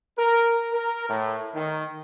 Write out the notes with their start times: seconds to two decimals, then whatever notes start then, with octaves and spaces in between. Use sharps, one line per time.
0.19 A#4
0.72 A#4
1.09 A2
1.54 D#3